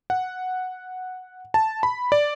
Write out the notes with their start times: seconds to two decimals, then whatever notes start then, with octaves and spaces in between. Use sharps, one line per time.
0.10 F#5
1.54 A5
1.83 B5
2.12 D5